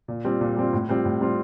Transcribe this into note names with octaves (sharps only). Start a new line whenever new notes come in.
A#2
G3 C4 F4
A#2
G3 C4 F4
A2
G3 C4 F4
A2
G3 C4 F4